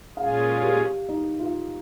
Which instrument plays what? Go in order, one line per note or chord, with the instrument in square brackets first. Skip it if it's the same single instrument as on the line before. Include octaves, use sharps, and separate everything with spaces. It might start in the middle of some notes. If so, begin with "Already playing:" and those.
[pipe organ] A#2 G#3 C#4 F4 G#4 [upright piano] F5
[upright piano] G4
D#4
F4